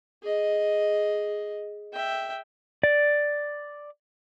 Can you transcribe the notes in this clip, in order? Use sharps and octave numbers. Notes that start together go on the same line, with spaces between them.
G#4 D#5
E5 G5
D5